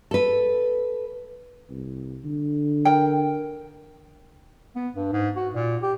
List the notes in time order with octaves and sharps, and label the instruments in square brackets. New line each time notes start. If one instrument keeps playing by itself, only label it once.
[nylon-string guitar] A4 B4
[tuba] C2
D3
[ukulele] A#4 G5
[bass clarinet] B3
G2
G#2
F#4
A#2
G4